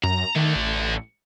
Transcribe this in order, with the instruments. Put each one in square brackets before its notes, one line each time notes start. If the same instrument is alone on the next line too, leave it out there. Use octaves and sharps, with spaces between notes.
[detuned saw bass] F#2 [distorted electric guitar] A#5
[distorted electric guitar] D3 A3 [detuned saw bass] D#3
[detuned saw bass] A1